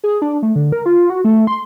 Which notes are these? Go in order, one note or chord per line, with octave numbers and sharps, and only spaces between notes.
G#4
D4
A3
D3
A#4
F4
F#4
A3
C6